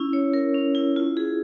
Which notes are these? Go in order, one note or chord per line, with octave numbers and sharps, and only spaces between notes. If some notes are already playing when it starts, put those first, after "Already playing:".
Already playing: C#4 E4
C#5
A#4
C#4
E4
F4
G#4